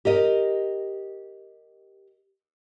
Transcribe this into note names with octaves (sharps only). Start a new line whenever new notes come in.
G4 A#4 D#5